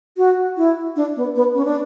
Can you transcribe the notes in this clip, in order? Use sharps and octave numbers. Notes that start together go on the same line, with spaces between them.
F#4
E4
D4
B3
B3
C#4
D4